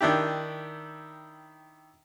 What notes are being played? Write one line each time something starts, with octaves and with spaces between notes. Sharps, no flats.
D#3 D4 E4 G4